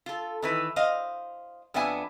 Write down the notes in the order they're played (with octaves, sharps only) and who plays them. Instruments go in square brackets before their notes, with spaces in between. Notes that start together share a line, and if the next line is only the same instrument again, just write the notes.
[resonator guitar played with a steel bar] F4 A4
D#3 E3 B4
C5 D#5 F5
F2 B3 D4 E5 F#5 G#5